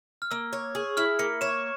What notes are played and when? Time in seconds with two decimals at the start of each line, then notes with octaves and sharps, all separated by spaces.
0.22 F6
0.31 A#3 E6
0.53 C#5
0.75 G#4
0.97 E4 F6
1.19 A#3 C#7
1.41 C#5 E7